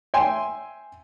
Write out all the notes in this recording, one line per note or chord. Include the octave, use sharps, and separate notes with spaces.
E5 G5 G#5 C6